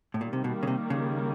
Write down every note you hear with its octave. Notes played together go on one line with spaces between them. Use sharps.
A2
A#2 D#3 G3 A#3
C3
B2
C#3
C3
C#3